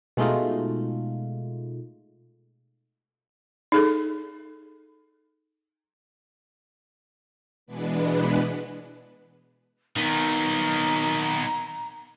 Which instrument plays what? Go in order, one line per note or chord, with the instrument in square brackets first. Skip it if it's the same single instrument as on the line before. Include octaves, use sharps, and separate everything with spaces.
[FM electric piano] B2 G#3 A3 D#4 F4
[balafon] D#4 G#4 A4
[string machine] B2 E3 G#3 B3 D4 B4
[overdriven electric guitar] D#3 [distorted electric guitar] B3 D#4 [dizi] A#5